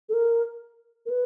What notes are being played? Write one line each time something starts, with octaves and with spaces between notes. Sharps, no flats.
A4
A#4
A#4
B4